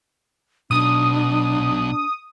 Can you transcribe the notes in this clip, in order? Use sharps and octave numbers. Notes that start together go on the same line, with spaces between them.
B1 B2 D4 D#6